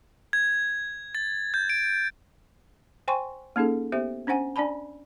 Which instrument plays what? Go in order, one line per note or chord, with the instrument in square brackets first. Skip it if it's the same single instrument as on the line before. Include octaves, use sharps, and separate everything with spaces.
[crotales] G#6
A6
G6
D7
[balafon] C5 G5 G#5 C6 C#6
A#3 C#4 D#4 G#4 A4
B3 G4 C5 E5
C#4 D4 C5 F#5 G#5
D4 D5 G#5 A5 B5